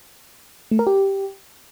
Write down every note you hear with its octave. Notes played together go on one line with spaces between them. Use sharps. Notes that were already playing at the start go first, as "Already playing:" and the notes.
A3
A#4
G4